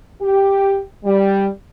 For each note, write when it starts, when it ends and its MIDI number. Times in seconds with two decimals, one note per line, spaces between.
0.21 0.80 67
1.04 1.47 55